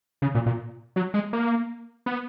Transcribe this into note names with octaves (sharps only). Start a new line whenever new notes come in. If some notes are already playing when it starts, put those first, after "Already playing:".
C#3
A#2
A#2
F#3
G#3
A#3
B3